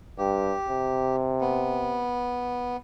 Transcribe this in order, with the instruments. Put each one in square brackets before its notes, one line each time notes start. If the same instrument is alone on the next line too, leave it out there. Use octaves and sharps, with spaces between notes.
[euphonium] G2 [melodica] G4
[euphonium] C3
[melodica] B3